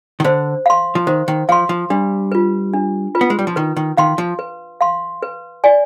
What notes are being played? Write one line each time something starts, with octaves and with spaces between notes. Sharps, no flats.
D#3
D3 C5
F5 C6
F3
D#3 C5
D#3
F3 F5 C6
F3
G3 D4
F4 B4
D4
F4 B4
B3
G#3
G3
F3
D#3 B4
D#3
D#3 F5 C6
F3
B4
F5 C6
B4
D5 G#5